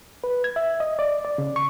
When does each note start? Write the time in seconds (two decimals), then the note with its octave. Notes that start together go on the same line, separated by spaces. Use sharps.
0.24 B4
0.44 G#6
0.56 E5
0.80 D#5
0.99 D5
1.25 D5
1.38 C#3
1.56 C#6